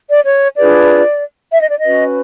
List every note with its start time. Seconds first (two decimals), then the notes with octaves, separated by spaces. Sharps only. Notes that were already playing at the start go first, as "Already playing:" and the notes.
0.09 D5
0.25 C#5
0.57 D4 F4 G#4 B4 D5
1.52 E5
1.61 D#5
1.70 D5
1.78 D#5
1.84 C#4 F#4 B4